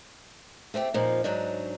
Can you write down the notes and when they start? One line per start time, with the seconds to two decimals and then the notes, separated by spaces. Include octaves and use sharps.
0.74 A3 C4 E4 G4
0.94 F2 A#2 F3 D#4
1.24 G#2 F#3 D4 D#4